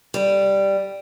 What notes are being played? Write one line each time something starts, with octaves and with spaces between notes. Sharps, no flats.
G3